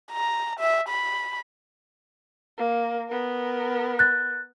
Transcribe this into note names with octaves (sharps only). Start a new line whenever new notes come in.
A#5
E5
B5
A#3
B3 A#4
F#6 A6